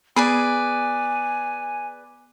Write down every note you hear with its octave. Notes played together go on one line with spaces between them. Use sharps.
B3 G#4 B4 D5 G#5